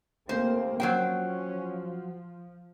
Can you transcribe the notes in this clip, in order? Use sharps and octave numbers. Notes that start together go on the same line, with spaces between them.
D#2 A3 A#3 C4 C5
F3 F#3 C#4 C5 G5